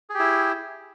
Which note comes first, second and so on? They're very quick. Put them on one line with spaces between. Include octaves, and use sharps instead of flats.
G#4 G4 E4